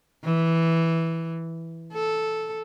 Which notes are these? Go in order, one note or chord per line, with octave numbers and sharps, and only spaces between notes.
E3
A4